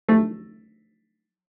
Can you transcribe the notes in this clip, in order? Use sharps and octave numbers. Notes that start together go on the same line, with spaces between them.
A3